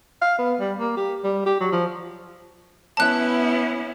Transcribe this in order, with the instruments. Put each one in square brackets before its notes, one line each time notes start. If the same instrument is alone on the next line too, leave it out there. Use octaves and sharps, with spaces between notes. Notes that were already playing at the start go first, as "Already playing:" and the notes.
[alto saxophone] F5
B3
G3
A#3
G4
G3
G4
F#3
F3
[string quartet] B3 C#4 E4 [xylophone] A5 F#6